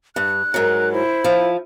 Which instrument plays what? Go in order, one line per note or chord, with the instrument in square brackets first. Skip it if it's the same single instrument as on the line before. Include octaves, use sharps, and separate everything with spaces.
[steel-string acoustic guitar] G2 [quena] F#6
[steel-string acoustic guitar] G#2 F#3 [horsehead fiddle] A#4
[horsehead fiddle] E4 [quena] C5
[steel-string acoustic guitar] F3